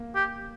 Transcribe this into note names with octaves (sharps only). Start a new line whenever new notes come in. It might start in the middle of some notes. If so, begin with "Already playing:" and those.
Already playing: A#3
G4